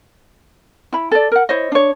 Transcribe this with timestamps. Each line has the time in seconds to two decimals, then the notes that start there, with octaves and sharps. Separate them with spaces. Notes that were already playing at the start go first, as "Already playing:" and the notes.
0.93 E4 B5
1.11 A4 D5
1.32 A#4 F#5
1.49 E4 C5 C#5 D#5
1.72 D4 C#5